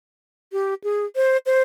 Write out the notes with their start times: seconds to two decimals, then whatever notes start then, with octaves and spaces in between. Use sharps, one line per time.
0.53 G4
0.84 G#4
1.16 C5
1.46 C5